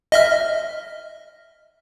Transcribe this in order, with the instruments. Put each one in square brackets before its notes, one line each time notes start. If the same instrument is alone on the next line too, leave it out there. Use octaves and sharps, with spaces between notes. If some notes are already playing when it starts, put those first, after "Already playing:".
[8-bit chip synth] D#5 E5 F6